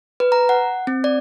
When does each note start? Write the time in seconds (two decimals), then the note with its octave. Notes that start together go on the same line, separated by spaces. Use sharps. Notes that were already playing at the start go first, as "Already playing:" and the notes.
0.20 B4
0.32 A#5
0.49 F#5
0.87 C4
1.04 D5